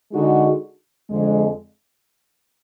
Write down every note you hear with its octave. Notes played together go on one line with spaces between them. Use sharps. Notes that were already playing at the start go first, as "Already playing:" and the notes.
D3 G#3 D#4 F#4
F2 D3 G#3